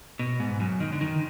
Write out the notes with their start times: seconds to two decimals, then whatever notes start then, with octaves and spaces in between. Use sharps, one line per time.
0.19 B2
0.40 G#2
0.60 F#2
0.80 D#3
0.93 D3
1.01 D#3